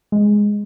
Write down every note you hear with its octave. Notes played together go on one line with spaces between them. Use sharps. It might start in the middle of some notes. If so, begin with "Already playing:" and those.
G#3